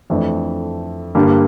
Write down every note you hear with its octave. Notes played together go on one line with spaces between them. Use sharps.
F2 E3 A3 D4
G2 D3 G3 A#3